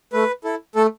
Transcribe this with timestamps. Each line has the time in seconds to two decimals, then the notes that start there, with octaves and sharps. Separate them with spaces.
0.13 A3 B4
0.44 E4 A4
0.75 A3 A4